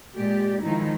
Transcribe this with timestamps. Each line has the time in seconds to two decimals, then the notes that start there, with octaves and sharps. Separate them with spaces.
0.16 A#2 G#3 G4 D5
0.61 D#3 F3 G#3 D#4 E4